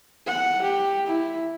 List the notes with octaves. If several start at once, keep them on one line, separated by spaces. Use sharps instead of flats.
F#5
G4
E4